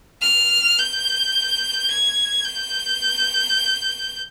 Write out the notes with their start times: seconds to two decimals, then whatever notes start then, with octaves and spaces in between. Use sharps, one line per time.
0.22 F6
0.78 G6
1.90 G#6
2.45 G6